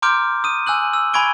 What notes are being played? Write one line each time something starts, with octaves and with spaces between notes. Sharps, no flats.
A#5 C6 D6 F6 G6 D7
D#6 D#7
G#5 E6 F#6 F#7
E6
G#5 B5 C#6 G#6 D7 G7